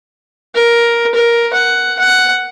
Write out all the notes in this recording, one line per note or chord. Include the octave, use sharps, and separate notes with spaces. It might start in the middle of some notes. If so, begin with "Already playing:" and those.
A#4
A#4
F#5
F#5